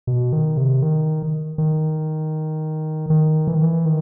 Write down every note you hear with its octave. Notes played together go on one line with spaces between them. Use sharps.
B2
D#3
C3
D#3
D#3
D#3
E3
D#3
E3
D#3